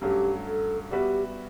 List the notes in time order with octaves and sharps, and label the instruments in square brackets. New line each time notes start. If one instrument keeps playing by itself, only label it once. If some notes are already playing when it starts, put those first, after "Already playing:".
[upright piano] G2 F#3 A3 C#4 [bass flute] G4
[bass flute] A4
[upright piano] G3 B3 F#4 B4 E5 [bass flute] G4